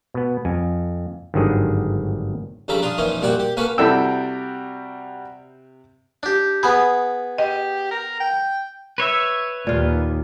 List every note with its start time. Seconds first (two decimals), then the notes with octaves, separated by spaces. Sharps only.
0.14 B2 B3
0.45 F2 G#5
1.34 G#1 G2 D3 D#3 F#3 G#4
2.68 G2 C#3 F3 A4 A#5 B5
2.82 D4 F4 A#5 D#6
2.98 A#2 E3 F3 C#4 D#4
3.21 C2 A#2 F#4 D5 F#5 G5
3.40 G4
3.57 A#3 C#4 F#4 A4 B4
3.78 C3 G3 E4 F#4 A4 D5 G5 E6
6.23 D4 G4
6.63 B3 G#4 B5
7.38 G4 D#5
7.91 A#4
8.20 G5
8.98 B4 C#5 E5
9.67 D#2 A#2 F4